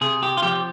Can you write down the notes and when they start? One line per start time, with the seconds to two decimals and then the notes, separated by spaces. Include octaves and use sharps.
0.01 C3 G#4
0.23 G4
0.37 F4
0.43 F3 G4